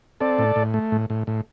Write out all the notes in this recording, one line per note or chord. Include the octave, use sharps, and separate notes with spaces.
C4 A4 D5
A2
A2
A3
A2
A2
A2